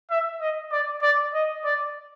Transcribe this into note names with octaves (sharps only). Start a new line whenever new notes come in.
E5
D#5
D5
D5
D#5
D5